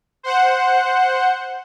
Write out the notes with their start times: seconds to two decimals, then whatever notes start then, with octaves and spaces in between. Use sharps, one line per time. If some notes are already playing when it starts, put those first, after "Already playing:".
0.23 C5 F#5